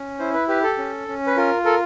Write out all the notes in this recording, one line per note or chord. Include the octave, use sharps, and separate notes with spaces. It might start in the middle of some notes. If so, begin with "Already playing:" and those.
Already playing: C#4
E4 C5
B4
G4 B4
A4
C#4
C#4
B4
F4 A#4
A4 A#4